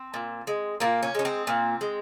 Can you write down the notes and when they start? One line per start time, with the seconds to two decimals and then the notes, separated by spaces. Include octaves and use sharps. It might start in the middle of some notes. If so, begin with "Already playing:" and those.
Already playing: C4
0.14 A#2
0.47 G#3
0.80 A#2 A#3
1.03 C#4
1.15 G#3 C#4
1.25 C4
1.47 A#2
1.81 G#3